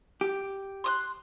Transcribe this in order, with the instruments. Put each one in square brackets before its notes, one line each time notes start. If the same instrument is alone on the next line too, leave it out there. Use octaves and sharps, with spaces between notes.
[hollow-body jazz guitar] G4
[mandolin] C6 D#6 F#6